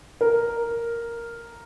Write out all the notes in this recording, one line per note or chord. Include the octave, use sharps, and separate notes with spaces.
A#4